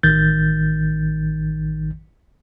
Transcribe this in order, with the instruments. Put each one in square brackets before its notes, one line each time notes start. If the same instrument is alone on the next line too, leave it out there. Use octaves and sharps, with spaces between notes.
[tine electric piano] A1 D#3 G6 A6